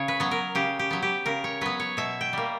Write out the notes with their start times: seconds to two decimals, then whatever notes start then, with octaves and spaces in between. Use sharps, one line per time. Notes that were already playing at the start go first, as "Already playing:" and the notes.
Already playing: C#3 C#5
0.08 B4
0.20 F#3 B3
0.31 A#4
0.55 C#3 G4
0.79 G4
0.91 F#3 B3
1.03 G4
1.26 C#3 A#4
1.44 C#5
1.61 F#3 B3 B4
1.80 C#5
1.97 B2 E5
2.21 G5
2.33 G3 A#3